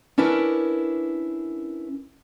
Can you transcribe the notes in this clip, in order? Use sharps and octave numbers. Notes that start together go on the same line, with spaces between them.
C#4 D4 E4 A#4 B4